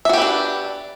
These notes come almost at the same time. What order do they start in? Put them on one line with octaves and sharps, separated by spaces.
E5 F#4 G4 B4 D4